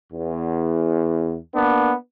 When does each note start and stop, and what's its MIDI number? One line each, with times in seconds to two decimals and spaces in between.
0.13 1.37 40
1.54 1.93 58
1.54 1.93 59
1.54 1.93 62